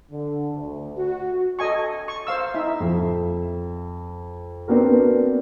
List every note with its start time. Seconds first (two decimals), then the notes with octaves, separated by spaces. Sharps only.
0.11 D3
0.54 D2
0.97 F#4
1.59 A4 D#5 G#5 C#6
2.08 C#6
2.27 C5 F5 E6
2.54 D#4 E4 E5
2.80 F2
4.68 B3 C4 D4 F#4 A#4